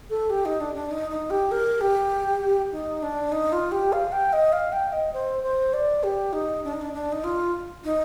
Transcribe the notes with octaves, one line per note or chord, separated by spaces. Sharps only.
A4
G4
D#4
D4
D4
D#4
D#4
G4
A#4
G4
D#4
D4
D#4
F4
G4
F5
G5
D#5
F5
G5
D#5
C5
C5
D5
G4
D#4
D4
D#4
D4
D4
D#4
F4
D#4